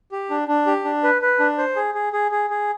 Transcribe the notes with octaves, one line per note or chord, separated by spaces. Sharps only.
G4
D4
D4
G4
D4
B4
B4
D4
C5
G#4
G#4
G#4
G#4
G#4